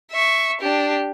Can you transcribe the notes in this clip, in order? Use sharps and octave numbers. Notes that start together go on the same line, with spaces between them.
E5 C#6
D4 G4